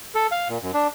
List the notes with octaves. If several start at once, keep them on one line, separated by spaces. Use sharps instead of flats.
A4
F5
A#2
F#2
D4